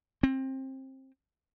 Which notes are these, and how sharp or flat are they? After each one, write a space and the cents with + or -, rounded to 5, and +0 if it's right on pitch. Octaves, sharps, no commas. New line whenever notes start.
C4 +25